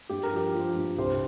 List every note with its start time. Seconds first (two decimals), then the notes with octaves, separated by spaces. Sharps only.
0.09 G2 G4
0.23 A#4
0.32 F3 G4
0.55 F3
0.76 G2
0.98 C2 G4 C5